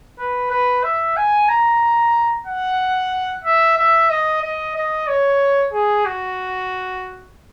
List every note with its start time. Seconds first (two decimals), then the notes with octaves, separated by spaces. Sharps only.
0.19 B4
0.51 B4
0.84 E5
1.17 G#5
1.49 A#5
2.47 F#5
3.44 E5
3.78 E5
4.10 D#5
4.42 D#5
4.75 D#5
5.08 C#5
5.73 G#4
6.06 F#4